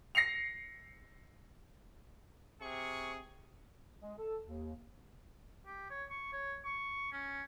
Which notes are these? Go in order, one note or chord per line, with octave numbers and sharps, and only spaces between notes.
A#6 C7 C#7 F7
C3 G#4 C#6
G#3
A4
D#2
G4
C#5
C#6
C#5
C#6
C#4